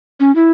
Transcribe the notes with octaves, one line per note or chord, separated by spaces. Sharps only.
C#4
E4